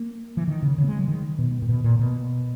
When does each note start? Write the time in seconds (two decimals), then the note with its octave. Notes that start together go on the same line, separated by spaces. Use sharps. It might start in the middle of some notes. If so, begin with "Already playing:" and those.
Already playing: A#3
0.37 E3
0.48 D#3
0.62 C#3
0.78 C#3
0.84 A#3
0.88 G#3
0.98 F#3
1.08 D#3
1.39 B2
1.62 A#2
1.69 B2
1.84 A#2
1.99 B2